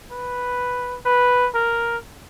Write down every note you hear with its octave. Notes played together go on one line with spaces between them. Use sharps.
B4
B4
A#4